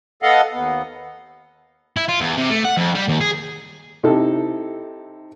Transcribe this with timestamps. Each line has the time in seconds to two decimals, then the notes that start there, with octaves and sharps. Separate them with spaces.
0.22 B3 A4 D#5 F5 F#5
0.53 D#2 B3
1.97 E4
2.09 F4
2.21 E2
2.37 C3
2.49 A3
2.64 F#5
2.77 F2
2.95 G3
3.08 D#2
3.21 G#4
4.03 C3 D#4 E4 A4